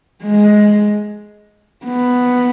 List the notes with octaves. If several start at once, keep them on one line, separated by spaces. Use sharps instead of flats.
G#3
B3